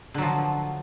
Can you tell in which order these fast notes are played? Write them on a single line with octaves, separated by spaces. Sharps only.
D3 F#3 F3